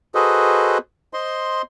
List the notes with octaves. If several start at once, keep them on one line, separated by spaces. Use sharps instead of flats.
F#4 G#4 A4 B4 C5 D#5
C5 D#5 C6